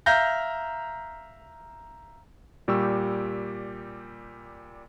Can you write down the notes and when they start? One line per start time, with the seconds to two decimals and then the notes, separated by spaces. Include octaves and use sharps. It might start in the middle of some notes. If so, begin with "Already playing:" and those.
0.06 E5 F5 A#5 F6 G6 A#6
2.68 A#2 G3 G4 C#6 E6